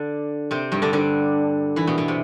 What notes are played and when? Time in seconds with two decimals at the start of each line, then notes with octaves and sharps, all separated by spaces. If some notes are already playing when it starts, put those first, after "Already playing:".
Already playing: D3 D4
0.51 C3 C4
0.72 G2 G3
0.82 D3 D4
0.93 D3 D4
1.76 E3 E4
1.87 B2 B3
1.98 B2 B3
2.08 C3